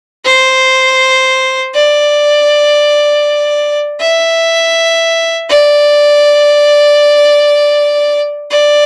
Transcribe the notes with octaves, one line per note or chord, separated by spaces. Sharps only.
C5
D5
E5
D5
D5